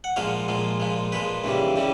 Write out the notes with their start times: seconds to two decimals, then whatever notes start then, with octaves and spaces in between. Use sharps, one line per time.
0.04 F#5
0.16 A#2 F3 G#3 F5
0.48 A#2 F3 G#3
0.80 A#2 F3 G#3
1.12 A#2 F3 G#3 B4
1.44 D#2 C#3 E3 G3
1.76 C#3 E3 G3